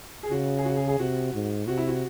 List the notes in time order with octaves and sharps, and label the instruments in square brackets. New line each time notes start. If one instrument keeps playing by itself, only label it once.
[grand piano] G#4
[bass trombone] C#3 [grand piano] F#4
[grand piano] G#4
F#4
G#4
G#4
[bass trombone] C3 [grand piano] F#4
[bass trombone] G#2
[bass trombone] C3 [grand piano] F#4
[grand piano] E4
F#4